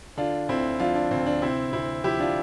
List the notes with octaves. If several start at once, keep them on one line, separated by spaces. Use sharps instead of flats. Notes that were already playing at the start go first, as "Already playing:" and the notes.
D3 D4 F4
D2 C4 E4
F3 D4 F4
D4
D2 C4
D4
C3 C4 E4
D2 C4 E4
F3 E4 G4
D4 F4